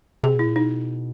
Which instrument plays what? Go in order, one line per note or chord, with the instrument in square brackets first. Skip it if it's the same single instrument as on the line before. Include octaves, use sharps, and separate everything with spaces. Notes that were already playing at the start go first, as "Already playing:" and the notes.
[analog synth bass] C3 [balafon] G#4
[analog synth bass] B2 [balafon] E4
[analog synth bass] A#2
[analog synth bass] B2 [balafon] D#4